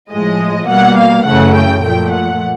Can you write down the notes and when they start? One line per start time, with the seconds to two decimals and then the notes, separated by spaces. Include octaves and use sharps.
0.11 A2 F3 G#3 D#5
0.68 B2 G3 A#3 F#5
0.98 F5
1.26 F#2 C#3 E3 A3 F#5
1.55 G5
1.83 A#2 F3 A3 G5
2.12 F#5